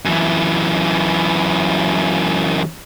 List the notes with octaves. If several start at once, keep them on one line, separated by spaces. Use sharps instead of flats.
F#2 E3